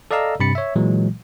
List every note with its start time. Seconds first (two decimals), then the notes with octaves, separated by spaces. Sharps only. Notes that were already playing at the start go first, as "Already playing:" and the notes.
0.11 A4 D5 D#5 F5 A#5 E6
0.40 G2 C3 B5 A6 C#7
0.55 C#5 E5
0.76 A#2 E3 F#3 G#3